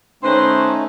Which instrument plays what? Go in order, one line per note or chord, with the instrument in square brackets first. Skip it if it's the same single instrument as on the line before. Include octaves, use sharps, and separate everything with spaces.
[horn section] D#3 B4 C5 [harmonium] A3 C#4 D#4